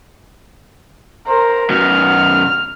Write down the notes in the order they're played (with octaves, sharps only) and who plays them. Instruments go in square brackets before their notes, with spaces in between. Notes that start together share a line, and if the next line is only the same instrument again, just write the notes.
[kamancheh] A#4 C5
[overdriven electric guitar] F#2 B2 [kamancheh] F6